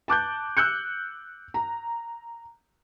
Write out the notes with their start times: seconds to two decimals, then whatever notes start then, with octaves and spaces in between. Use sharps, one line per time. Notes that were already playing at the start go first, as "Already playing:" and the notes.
0.08 A5 D6 F#6 G6
0.57 E6 F#6 G6 C#7
1.54 A#5